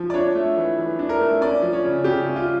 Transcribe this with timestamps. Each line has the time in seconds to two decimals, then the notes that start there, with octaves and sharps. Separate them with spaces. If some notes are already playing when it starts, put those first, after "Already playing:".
Already playing: F3
0.10 D5
0.14 D4 C#5
0.35 A3
0.57 E3
0.78 E3
0.99 D4
1.09 A#4
1.21 A3
1.41 C#4 D5
1.62 F3
1.73 C#5
1.84 C#3
2.04 C#3 G4
2.26 C#4
2.36 F4